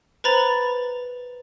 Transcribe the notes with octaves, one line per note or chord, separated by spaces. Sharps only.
B4 C5 A#5 B5 A6